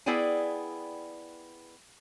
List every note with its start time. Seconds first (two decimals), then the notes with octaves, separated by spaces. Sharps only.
0.06 B3 E4 G#4 D5 G5 G#5